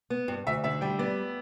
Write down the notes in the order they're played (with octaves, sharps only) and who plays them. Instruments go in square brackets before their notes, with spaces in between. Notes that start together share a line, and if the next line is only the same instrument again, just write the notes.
[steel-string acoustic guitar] B3
G2
[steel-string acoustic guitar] D2 [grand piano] E5
[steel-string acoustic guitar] D3 [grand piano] E5
[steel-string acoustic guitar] G3 [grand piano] G5
[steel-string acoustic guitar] B3 [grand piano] D5